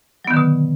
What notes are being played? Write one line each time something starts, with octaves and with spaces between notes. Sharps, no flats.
B2 D3 D#3 F#3 B3